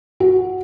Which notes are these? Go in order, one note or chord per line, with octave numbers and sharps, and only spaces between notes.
F#4